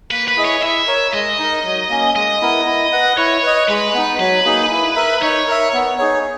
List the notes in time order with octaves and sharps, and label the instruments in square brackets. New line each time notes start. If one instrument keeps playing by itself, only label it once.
[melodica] A#3 [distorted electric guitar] B4
[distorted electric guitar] B4
[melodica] E4 G#4 D#5
[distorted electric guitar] C#5
[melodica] E4 [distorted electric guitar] E5
[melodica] A#4 C#5
[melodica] G#3 [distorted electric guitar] D#5
[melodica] D#4 A#4
F#3
A#3 C#4
[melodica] G#3 [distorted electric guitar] D#5
[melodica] B3 E4 A#4
E4
B4 F#5
[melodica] E4 [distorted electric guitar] C#5
[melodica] B4 D#5
[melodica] G#3 [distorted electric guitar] B4
[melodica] B3 D#4
[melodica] F#3 [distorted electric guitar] B4
[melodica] A#3 D#4 G#4
E4
A#4 E5
[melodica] D#4 [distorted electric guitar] C#5
[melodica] A#4 E5
B3
D#4 G#4 C#5